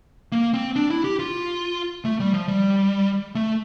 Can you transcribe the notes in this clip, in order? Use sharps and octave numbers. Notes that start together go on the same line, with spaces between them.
A#3
C4
D4
E4
G4
F4
A3
G3
F3
G3
A3